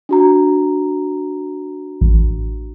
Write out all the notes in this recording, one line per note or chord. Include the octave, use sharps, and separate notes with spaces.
D4 F#4 A#5
A1